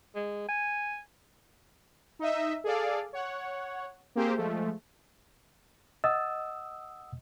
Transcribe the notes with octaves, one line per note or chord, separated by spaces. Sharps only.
G#3
G#5
D#4 D#5 E5
G#4 A4 D5 F5
C#5 F#5
A#3 C4 G4 G#4 C5
F3 G#3 A3
D#5 F#5 D#6 E6